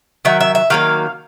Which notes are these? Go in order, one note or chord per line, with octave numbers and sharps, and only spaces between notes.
D#3 F#3 E5
E5
E5
D#3 F#3 A#3 F5